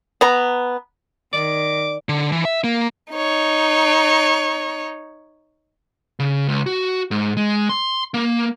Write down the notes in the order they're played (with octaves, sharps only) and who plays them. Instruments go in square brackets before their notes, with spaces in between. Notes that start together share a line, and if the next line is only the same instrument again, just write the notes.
[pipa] B3 A#5
[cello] D#3 [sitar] D5 [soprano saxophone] D6
[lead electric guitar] D3
E3
E5
A#3
[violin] D#4 C#5
[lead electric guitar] C#3
C#2
F#4
G#2
G#3
C6
A#3